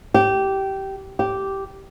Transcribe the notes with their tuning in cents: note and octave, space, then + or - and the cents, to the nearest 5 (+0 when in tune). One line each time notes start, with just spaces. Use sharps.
G4 -15
G4 -10